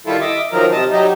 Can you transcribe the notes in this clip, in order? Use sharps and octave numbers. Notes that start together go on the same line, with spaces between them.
D#3 G3 E4 F4 A4
D#5 E5 D6
D#3 F3 F#3 A#4
C3 D#5 A5
F#3 G3 D#4